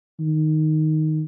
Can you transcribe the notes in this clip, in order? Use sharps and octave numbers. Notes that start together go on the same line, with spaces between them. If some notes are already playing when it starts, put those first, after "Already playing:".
D#3